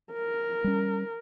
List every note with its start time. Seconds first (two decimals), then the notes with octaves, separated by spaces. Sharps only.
0.13 A#4
0.64 G3 C#4